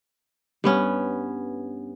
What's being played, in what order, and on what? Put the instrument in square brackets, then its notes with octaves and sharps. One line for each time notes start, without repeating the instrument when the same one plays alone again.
[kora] G2 B3 C#4